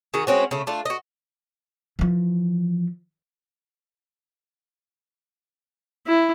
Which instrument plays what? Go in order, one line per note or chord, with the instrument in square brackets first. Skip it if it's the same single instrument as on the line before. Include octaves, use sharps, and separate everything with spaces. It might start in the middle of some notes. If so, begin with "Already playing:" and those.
[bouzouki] D#3 F#4 G#4
G#3 C4 C#4 F#4
C#3 A3
A3 D4 F4
F#4 D#5
[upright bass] E3 F3
[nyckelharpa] E4